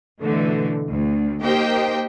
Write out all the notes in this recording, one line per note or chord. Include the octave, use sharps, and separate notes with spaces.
B2 D3 E3 A3
D2
A#3 D#4 G4 C5 D#5 G5